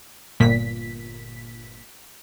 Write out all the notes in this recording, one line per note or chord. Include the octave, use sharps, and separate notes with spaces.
G1 A#2 B6